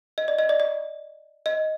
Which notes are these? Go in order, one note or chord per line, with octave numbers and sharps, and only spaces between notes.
D#5
D5
D#5
D5
D5
D#5